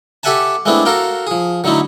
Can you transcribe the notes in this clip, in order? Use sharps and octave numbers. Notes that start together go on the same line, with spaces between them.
G4 A4 E5 F#5 G#5 A5
G#3 A3 B3 C4 D4 E4
F#4 A4 A#4 F5 G5
F3 G#4
D3 F#3 A3 D#4 E4